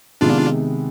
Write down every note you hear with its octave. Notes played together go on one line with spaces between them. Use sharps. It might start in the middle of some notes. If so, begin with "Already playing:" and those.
C3 D#3 G#3 B3 D4 F4